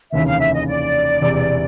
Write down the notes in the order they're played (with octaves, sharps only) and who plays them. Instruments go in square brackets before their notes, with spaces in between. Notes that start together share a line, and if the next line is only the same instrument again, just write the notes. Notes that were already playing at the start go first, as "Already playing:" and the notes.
[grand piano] F1 D#2 C#3 E3 [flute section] E5
[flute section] F5
E5
D#5
D5
[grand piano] E1 E2 C3